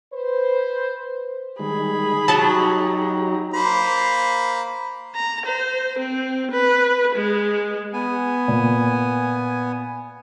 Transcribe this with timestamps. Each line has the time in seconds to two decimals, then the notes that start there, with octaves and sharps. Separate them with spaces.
0.14 B4 C5
1.59 D#3 G3 G#3 G#4 B5
2.28 F#3 D#4 G4 A5 A#5
3.54 A#3 C5 B5
5.15 A#5
5.46 C5
5.99 C4
6.51 B4
7.15 G#3
7.93 B3 G#5
8.48 A#2